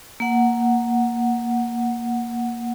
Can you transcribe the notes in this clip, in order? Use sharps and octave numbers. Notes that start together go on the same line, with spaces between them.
A#3 F#5